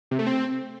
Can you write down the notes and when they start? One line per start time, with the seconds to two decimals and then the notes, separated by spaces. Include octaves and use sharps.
0.11 C3
0.19 A3
0.26 C4